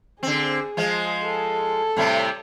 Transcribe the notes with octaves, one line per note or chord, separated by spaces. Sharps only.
D3 C4 G#4
F3 G#3
A4
A2 C3 G3